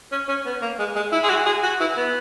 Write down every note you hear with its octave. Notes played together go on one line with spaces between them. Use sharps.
C#4
C#4
B3
A#3
G#3
G#3
E4
G#4
F#4
G#4
F#4
E4
B3